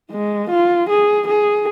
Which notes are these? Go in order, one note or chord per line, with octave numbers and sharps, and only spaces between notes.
G#3
F4
G#4
G#4